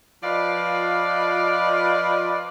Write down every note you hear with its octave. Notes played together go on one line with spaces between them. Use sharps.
F3 F4 B4 D5 D#5 F5